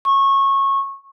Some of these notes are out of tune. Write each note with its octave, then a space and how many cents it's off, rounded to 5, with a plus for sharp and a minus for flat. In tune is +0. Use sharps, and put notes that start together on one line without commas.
C#6 -20